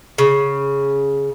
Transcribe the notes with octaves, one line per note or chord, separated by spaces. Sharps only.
C#3